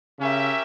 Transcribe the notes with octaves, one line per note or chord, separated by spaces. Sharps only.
C#3 C#4 G4 A#4 E5